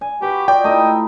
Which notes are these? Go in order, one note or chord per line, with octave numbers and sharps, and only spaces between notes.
G#5
F#4 G4 B4
F4 D5 D#5 G5
A3 D#4 E4 D#5